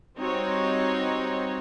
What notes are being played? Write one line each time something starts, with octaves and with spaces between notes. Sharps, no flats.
G3 C4 D#4 F#4 C#5